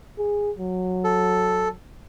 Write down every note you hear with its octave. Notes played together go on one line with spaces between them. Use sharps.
G#4
F#3
A4